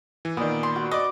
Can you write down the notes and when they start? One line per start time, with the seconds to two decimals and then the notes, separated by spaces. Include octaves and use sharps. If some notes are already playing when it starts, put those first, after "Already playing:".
0.25 E3
0.37 A#2 D#3 B3 D5
0.63 C6
0.76 F#4
0.92 D5 D#5 D6